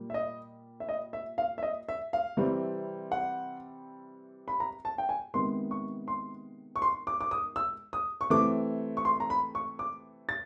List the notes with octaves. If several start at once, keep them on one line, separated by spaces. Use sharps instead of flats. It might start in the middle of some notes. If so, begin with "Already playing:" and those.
Already playing: A#2 G3 A#3
E5
D#5
E5
D#5
E5
F5
E5
D#5
E5
F5
C3 E3 G3 C4
F#5
B5
A#5
A5
G5
G#5
C3 D#3 G#3 B3 C6
C#6
C6
C#6
C6
D6
D6
D#6
E6
D#6
C#6
C3 E3 A3 C4 D6
C#6
C6
A#5
B5
C#6
D6
A6